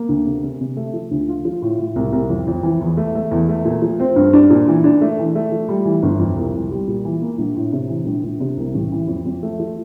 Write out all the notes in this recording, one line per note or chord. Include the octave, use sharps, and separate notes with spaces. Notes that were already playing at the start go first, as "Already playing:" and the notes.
Already playing: A#3
D2
C3
C3
C3
A3
F3
D2
F4
F3
A2
A2
C2
C2
F2
F2
E3
E2
A3
A3
E2
A3
A#2
F3
C4
G2
D4
A#2
E3
D4
A3
E3
A3
F3
G3
E3
G1
F2
C2
C2
G3
A#2
E3
A#3
A#1
A2
C3
E3
A#1
A#1
C3
C2
A1
E3
F2
F2
A3
F3